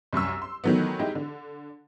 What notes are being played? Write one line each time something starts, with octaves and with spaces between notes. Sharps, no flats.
C2 F#2 C#6 E6
C6
D#3 E3 F#3 A3 B3
G#3 D#4 E4 G4
D3